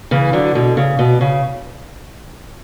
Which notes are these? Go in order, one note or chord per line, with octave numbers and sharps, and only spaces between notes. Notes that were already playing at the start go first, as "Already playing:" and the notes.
C#3 E3
D3 F#3
B2 D3
C#3
B2
C#3